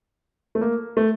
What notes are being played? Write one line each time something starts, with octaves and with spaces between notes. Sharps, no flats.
A3
A#3
A3